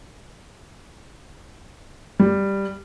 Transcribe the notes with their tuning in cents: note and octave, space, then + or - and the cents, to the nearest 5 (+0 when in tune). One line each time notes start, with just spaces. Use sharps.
G3 +5